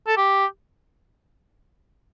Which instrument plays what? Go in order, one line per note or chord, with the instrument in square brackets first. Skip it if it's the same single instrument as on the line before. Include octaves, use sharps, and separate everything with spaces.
[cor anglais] A4
G4